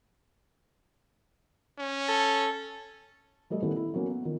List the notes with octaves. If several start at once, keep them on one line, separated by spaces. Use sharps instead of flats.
C#4
A4
G3 A3 A4 D#5
D#3 B3 C#4 E4 G4 A4
E4
F#3 A#3 B3 C#4
B3
D#3 F4